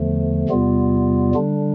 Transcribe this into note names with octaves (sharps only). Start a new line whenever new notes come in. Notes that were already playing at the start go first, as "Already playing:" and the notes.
Already playing: E2 D3 F3 A3
E2 C3 G3 B3 F4
D3 G3 D4